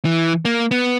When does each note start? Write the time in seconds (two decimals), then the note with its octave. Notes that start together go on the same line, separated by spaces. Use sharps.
0.05 E3
0.45 A#3
0.71 B3